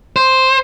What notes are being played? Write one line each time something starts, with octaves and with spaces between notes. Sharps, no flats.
C5